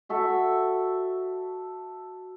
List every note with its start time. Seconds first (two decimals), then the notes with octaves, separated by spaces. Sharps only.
0.09 F#4 A4 E5 C#6